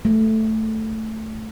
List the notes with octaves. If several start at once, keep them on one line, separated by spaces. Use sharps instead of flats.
A3